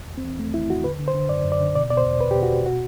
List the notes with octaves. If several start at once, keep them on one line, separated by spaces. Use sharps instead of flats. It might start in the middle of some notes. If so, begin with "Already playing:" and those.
Already playing: E2
E2
C4
E3
E2 A3
E3 E4
E2 F#4
D3 B4
D3
C5
D3
F#2 D5
F#2
D5
D3
B2 D5
B2 D5
C5
E2
E2 B4
G4
B2
F#4
B2
F#4